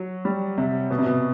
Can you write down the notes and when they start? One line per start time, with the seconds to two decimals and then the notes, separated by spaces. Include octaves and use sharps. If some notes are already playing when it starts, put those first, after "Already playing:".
Already playing: F#3
0.25 G3
0.58 C3
0.90 B2
0.98 C3
1.06 B2